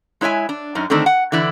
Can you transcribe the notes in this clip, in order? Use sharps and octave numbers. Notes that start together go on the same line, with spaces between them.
G#3 E4 C#5 E5 G#5
D4
F#2 C#4 D#4
D3 D#3 A3 C4 D4 D#4
F#5
D3 E3 E4 D5